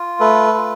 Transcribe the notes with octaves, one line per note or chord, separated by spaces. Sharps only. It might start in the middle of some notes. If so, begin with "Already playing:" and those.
Already playing: F4
A3 A4 B4
F4